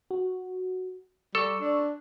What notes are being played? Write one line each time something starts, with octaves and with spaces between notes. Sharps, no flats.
F#4
G3 A4 C#6 D6 E6
D4